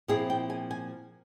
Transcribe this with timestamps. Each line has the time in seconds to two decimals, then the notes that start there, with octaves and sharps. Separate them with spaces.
0.08 A#2 F3 C4 E4 G#4
0.30 G5
0.50 G#5
0.71 G#5